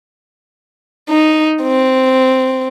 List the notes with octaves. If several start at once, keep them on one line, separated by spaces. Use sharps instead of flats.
D#4
C4